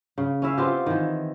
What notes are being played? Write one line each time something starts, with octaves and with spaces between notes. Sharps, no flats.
C#3
C#4 E4 E5 F5
B3 C4 F4 G4
D#3 E3